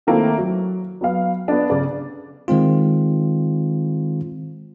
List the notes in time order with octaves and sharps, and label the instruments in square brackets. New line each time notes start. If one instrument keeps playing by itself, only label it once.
[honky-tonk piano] D#3 A3 A#3 C4 E4
F#3
F#3 B3 F5
B3 D4
C#3 D5
[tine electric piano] D#3 G#3 C4 F4